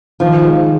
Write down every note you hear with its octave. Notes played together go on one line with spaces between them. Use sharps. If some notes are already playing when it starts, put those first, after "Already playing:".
D#3 F3
G#3